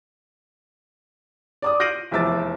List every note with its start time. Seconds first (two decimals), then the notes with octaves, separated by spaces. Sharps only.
1.62 D5 D6 D#6
1.80 G6 A#6 C7 D7 D#7 F#7
2.11 F1 E2 F3 E5 D6 A6